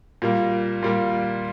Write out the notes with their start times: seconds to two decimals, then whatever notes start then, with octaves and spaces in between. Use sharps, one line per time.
0.22 A#2 G3 A#3
0.83 A#2 G3 A#3